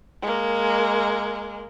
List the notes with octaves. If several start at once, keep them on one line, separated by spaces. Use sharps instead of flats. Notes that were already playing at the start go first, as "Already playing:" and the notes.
G#3 A#3